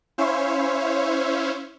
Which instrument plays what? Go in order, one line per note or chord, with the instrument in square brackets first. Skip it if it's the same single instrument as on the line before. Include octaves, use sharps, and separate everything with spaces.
[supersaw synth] C#4 E4 C5 C#5 E5 F5